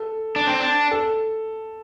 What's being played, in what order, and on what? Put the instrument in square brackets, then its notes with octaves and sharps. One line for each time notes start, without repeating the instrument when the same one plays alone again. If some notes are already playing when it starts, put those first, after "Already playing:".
Already playing: [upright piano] A4
[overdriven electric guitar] D4
C4
D4
[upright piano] A4